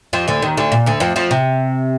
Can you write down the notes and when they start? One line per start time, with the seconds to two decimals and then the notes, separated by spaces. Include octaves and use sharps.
0.13 F2 F3
0.28 D2 D3
0.42 D#2 D#3
0.57 D2 D3
0.72 A#2
0.86 D2 D3
1.00 F2 F3
1.16 F2 F3
1.31 C3